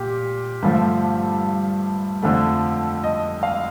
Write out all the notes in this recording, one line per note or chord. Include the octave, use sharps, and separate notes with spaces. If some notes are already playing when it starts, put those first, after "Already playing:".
Already playing: A#2 G4
G2 D3 F3 A3
F2 D3 F3 A3
D#5
F5